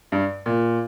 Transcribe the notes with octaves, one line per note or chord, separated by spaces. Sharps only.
G2
A#2